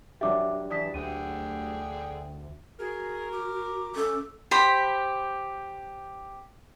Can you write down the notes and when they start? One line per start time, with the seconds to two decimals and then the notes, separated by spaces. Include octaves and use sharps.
0.21 F#3 D4 G4 E5 D6
0.70 E3 D5 A5 D#6 B6
0.94 D2 D3 G#4 G5 D#7
2.80 F#4 G#4 A#4
3.32 D6
3.95 C#4 A4
4.51 G4 C5 B5